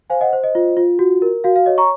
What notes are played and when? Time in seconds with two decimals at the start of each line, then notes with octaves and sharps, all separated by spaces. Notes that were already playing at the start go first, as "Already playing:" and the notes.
0.10 C5 F5 G#5
0.21 D#5 F#5
0.33 C5
0.44 D#5
0.55 F4
0.77 F4
0.99 F#4
1.22 A#4
1.44 F#4 F5
1.56 F5
1.66 C#5 D#5
1.78 A#5 C#6